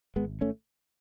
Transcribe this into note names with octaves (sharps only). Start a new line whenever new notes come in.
G#1 G#3 B3
A3 C#4